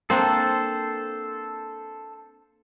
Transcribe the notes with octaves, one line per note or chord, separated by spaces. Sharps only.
A#3 C4 D4 A4 C5